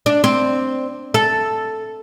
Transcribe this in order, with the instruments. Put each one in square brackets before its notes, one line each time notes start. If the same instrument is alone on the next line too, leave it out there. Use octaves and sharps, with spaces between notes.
[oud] D4
C4
A4